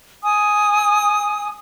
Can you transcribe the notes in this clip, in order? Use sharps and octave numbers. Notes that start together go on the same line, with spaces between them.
G#5 D#6